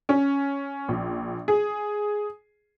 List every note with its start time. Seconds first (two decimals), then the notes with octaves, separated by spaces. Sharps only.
0.09 C#4
0.88 A#1
1.48 G#4